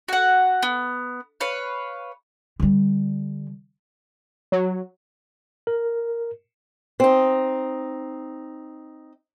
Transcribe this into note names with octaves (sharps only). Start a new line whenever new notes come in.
F#4 F#5
B3
B4 C#5 F5
D3 G3
F#3
A#4
C4 D#4